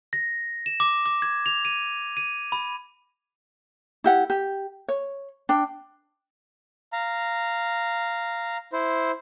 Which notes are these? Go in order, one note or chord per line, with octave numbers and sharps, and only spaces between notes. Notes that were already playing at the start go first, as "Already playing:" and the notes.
A#6
E7
D6
D6
G#6
F7
D#7
D#7
B5
E4 G4 F#5
G4
C#5
D4 G5
F5 A#5
E4 C5